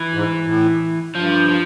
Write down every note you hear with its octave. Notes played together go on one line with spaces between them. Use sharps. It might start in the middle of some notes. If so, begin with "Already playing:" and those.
Already playing: E3
G#2
A2
G2 F3
F3